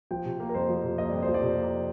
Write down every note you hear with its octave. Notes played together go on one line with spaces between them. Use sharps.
F3 G5
C3
A#3
A#4
F2 C5
F3
C3
A#3 D#5
F2 D5
C5
F3
D5
C3
A#3